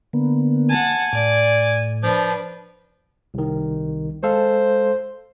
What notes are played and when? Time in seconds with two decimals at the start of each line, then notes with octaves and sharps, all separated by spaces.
0.13 D3 A#3 B3
0.70 F#5 G#5 A5
1.13 A2 D5
2.03 F3 D4 B4
3.34 C2 D#3
4.23 G#3 A4 C5 F5